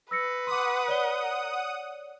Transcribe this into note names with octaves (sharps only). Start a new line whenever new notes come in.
B4 E6 A#6 C#7
F#5 C6 D6 D#6
C#5 D5 G7